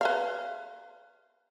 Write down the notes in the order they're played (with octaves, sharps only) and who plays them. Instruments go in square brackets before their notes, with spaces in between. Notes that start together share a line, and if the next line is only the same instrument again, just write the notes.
[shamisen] B4 E5 F5